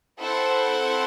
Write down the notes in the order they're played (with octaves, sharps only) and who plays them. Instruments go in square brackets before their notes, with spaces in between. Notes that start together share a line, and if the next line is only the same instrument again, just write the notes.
[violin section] C4 E4 A4 C5 F#5